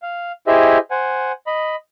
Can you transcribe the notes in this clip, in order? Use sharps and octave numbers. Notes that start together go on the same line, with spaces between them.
F5
E4 G4 G#4 C5 D#5 E5
C5 F#5 G#5
D#5 B5